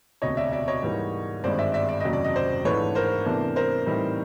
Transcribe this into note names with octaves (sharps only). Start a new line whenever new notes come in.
E1 D2 C3 C#5 D#5
D5 E5
D5 E5
C#5 D#5
G#2 E3 G3 A#3
G#1 G2 D#3 G#3 C5 D5
D5 E5
D5 E5
D5
F1 D#2 C#3 F#3 D#5
D5
D#5
C5 D5
G#2 E3 A3 D4 B4 C#5
A#4 C5
E2 C3 E3 A3 D4
A#4 C5
A2 E3 G3 C4 D#4